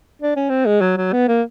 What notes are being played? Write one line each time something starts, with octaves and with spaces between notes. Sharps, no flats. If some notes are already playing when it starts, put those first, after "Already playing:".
D4
C#4
C4
G#3
F#3
F#3
B3
A#3